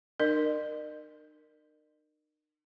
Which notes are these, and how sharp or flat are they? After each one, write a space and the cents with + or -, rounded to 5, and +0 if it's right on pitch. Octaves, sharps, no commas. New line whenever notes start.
D#4 -40 A#4 +0 D#5 -45